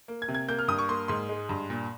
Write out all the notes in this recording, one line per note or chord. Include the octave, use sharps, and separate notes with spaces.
A#3
G#6
C3
G#6
A#3 G6
F6
G2 D#6
C#6
A#3 C6
G#2 C6
G#3
G2
A#2